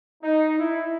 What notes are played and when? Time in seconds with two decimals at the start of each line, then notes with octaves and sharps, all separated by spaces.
0.23 D#4
0.59 E4